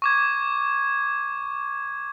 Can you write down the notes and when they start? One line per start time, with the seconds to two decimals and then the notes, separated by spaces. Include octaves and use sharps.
0.02 C#6 D6 G#6